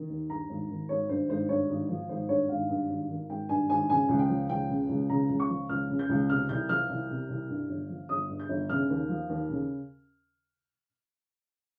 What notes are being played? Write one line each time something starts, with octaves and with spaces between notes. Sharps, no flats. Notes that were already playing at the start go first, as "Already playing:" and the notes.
Already playing: D#3
D#2
G2 A#5
G#1
D#3
G#1 C#5
G2 C5
G#1 C5
G2 C#5
G#1
F3
G#1 C5
G2 C#5
G#1 F5
G2
G#1
D#3
G#1 G5
G2 G#5
G#1 G#5
C#3 G#5
C#2
G5
F3
C#2 G5
C#3
C#2
C#3 A#5
C#2
C#6
F3
C#2 F6
C#3
G6
C#2
C3 F6
C2 G6
F3 F6
C2
C3
C2
G2
G1
F3
G1 D#6
G2
G6
G1
C#3 F6
D#2
F3
D#2
C#3